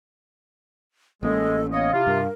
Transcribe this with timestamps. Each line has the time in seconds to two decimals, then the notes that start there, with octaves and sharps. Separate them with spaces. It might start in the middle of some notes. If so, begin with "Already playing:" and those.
1.23 A1 G#3 A#3 C#4 A4 D#5
1.72 B3 C#5 D#5 F5
1.93 C3 E4 F4
2.07 G2 A#4